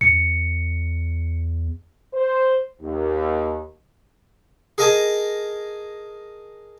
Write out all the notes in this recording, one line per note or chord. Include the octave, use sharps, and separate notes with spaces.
E2 C#7
C5
D#2
G#4 A#4 D#5 G#5 A5